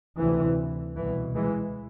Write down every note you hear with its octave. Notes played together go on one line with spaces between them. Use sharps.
D2 C3 E3
C2 B2 E3
E3 G#3